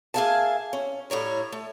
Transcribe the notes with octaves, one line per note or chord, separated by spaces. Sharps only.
A#3 G#4 E5 F5 G#5 A5
C#4
A2 G3 C#5 A#5
A3